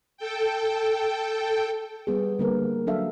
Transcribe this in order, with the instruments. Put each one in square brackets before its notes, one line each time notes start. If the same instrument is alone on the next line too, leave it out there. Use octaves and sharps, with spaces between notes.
[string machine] A4 G5
[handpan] G3 B3 G#4
D3 G3 A#3 B3 A#4 B4
F#3 D4 A4 E5 F5